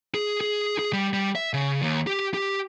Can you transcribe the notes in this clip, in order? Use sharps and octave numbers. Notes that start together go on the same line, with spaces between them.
G#4
G#4
G#4
G3
G3
E5
C#3
D#2
G4
G4